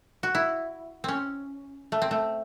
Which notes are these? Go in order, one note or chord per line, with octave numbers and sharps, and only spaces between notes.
F#4
E4
C4 C#4
A3
C4
A3